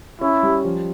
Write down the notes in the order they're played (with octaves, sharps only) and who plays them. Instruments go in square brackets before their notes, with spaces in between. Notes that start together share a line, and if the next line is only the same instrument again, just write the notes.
[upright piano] C#4 [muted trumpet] E4
[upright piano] G3
F3